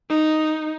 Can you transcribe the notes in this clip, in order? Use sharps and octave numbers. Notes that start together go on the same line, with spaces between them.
D#4